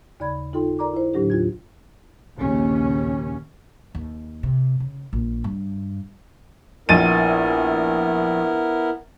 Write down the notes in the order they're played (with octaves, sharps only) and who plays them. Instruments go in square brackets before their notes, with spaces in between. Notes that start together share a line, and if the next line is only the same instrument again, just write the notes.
[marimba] D#2 C#3 D5 B5 G#6
D#4 F4 A4 G5 C6
A#4 D5 A#5 D6
E4 C5
A2 D3 F#3 D4 G4
D#2 F4 G#6
[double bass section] A#1 D#2 C#3 C#4
[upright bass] D#2
C3
C#3
A#1
G2
[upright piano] A#1 A6 D#7 [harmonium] B3 E4 A#4